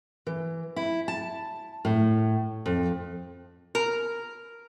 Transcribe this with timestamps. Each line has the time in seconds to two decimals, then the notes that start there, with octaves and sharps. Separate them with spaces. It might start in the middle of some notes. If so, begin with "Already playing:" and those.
0.27 E3
0.76 E4
1.08 A5
1.85 A2
2.66 F2
3.75 A#4